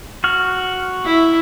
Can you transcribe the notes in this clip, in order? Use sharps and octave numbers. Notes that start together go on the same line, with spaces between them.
F#4 F6
E4